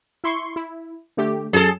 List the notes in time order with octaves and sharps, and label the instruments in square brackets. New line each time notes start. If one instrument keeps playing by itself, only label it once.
[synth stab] E4 C6 C#6
E4
D3 A3 G4
[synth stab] F#2 F#3 [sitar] G#4 A4